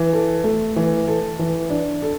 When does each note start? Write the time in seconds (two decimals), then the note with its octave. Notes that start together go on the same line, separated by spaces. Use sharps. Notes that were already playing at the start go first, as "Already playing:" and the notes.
Already playing: E3
0.13 A4
0.44 A3
0.76 E3
1.08 A4
1.39 E3
1.70 D4
2.02 A4